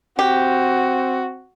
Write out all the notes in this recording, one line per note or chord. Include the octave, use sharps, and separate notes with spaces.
C4 F#4 G4